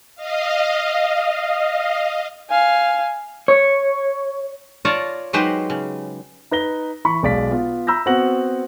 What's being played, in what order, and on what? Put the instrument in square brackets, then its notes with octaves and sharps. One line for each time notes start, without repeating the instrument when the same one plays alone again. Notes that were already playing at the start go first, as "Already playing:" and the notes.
[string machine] D#5 F5
[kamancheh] F5 G#5
[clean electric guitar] C#5
[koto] F4 C#5 D5 A5 A#5
F#3 G#3 D#4 G4 B4 C5
C#3
[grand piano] D#4 B4 A#6 G7
E3 B5 C#6
B1 G#3 D5 F5 B6
B3 F4
A#5 B5 E6 G6 A#6
B3 C4 F#4 F#5 A#6 F#7